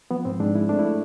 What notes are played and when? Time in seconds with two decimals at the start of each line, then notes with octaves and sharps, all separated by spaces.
0.11 F3 B3
0.25 G#2 C4
0.40 G#2 D4
0.55 G#2 E4
0.69 A3 D4
0.79 E4
0.85 A3